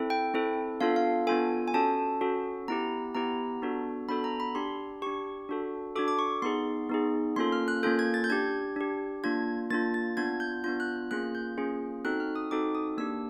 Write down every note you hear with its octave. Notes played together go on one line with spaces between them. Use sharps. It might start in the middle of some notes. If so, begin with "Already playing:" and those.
Already playing: C4 E4 A4
G5
C4 E4 A4
B3 D4 F4 A4 F5
F5
B3 D4 F4 A4 G#5
G#5
C#4 F#4 A4 A5
C#4 F#4 A4
B3 E4 G4 A#5
B3 E4 G4 A#5
B3 D4 F#4 A4
B3 D4 F#4 A4 B5
A#5
B5
D4 G4 C6
D4 G4 C#6
D4 F#4 A4
D4 F#4 A4 D6
D6
C#6
B3 D#4 G#4 C6
B3 D#4 G#4
A#3 C#4 F4 A4 C6
F6
F#6
A#3 C#4 F4 A4 G6
G#6
A6
G6
D4 G4 G#6
D4 G4
A#3 D4 F4 G#6
A#3 D4 F4 A6
A6
B3 D4 F4 G#6
G6
B3 D4 F4 G6
F#6
A#3 C#4 F4 G#4 F#6
G6
A#3 C#4 F4 G#4
C4 D#4 F#4 A4 F#6
F6
D#6
C4 D#4 F#4 A4 D6
D#6
A#3 D4 G4 E6